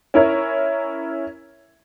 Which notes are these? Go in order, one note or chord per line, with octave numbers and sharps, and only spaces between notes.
C#4 E4 A#4 C#5